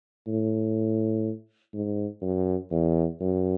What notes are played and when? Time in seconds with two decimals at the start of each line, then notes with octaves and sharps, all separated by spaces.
0.28 A2
1.74 G#2
2.22 F#2
2.71 E2
3.20 F#2